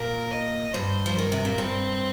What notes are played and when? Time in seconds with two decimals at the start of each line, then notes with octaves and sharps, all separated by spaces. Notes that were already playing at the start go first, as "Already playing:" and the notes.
Already playing: A#2 A#4
0.31 D#5
0.73 G2 C5
1.06 F3
1.16 D#3 A#4
1.32 C3
1.45 A#2
1.58 G2 C4